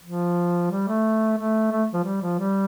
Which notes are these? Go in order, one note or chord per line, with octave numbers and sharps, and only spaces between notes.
F3
G3
A3
A3
A3
F3
G3
F3
G3